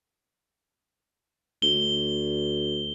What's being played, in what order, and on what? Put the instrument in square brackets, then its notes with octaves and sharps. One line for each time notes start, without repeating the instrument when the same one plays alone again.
[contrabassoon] D2 [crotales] G7